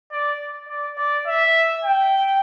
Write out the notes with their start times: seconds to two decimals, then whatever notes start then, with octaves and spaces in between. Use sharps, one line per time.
0.12 D5
0.68 D5
0.97 D5
1.26 E5
1.83 G5